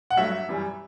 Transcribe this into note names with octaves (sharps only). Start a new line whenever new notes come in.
F#5
G2 F#3 A3 E5
F#2 E3 G3